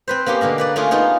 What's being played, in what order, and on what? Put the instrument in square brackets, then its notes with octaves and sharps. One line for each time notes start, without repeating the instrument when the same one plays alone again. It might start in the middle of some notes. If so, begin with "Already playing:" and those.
[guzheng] C4 B4 C5
A#3 B3 C#4 G4
B2 D3 A#3 A#4
A#4 B4 D5
A3 A#3 C#4 F4 G#4
B3 D#4 F4 G#4